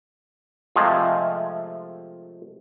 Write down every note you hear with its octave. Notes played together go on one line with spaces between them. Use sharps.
C3 F3 G#3 A3